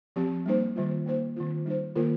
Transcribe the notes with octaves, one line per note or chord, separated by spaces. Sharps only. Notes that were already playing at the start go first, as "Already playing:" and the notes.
F3 C4 G4
G3 A#3 D#4 C5
D#3 G3 A#3 F4
A#3 D#4 C5
D#3 C4 F4
G3 D#4 C5
D#3 A#3 F4 A#4